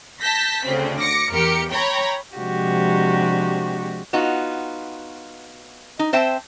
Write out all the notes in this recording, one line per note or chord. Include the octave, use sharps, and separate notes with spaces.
A5 G6 A#6 B6
D2 C#3 C4
D6 A#6 C#7
E2 G4 A#4 C#7
C#5 G5 A#5 B5
C3 F3 G#3 D4 F#4 G4
B3 D#4 F4 F#4
D#4
C4 C5 E5 G5 A5